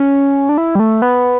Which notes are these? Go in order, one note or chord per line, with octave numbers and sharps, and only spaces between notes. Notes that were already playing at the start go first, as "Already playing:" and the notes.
Already playing: C#4
D4
E4
G3
A3
B3